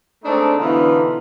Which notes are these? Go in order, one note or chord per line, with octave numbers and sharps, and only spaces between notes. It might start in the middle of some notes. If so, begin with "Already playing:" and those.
G#3 A3 C4 D4 D#4 A4
B2 D3 E3 B3 D#4 F4